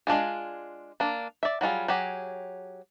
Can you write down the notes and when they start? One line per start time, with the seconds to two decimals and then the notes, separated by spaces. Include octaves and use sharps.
0.07 G#3 D4 F4 G#4
1.00 A#3 D4
1.43 D5 E5
1.61 F#3 G3 F4 G#4
1.88 F#3 G4 G#4